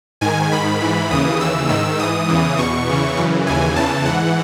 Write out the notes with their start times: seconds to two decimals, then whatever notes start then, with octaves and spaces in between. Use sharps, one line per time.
0.21 G#2 D#3 G#5
0.52 G#2 D#3 B5
0.81 G#2 E3
1.11 D#2 C#3 E3 D#6
1.40 D#2 C#3 E3 E6
1.69 G#2 D#3 E6
1.98 G#2 E3 D#6
2.28 E2 C#3 E3
2.58 E2 B2 C#6
2.87 E2 C#3 E3
3.17 F#2 C#3 E3
3.47 D#2 C#3 E3 G#5
3.75 E2 C#3 E3 A5
4.05 G#2 E3 F#5